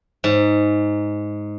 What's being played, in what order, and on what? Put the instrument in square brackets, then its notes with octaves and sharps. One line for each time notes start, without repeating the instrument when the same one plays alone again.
[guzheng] G#2